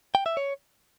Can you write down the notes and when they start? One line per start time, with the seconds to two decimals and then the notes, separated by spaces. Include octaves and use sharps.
0.15 G5
0.26 E5
0.37 C#5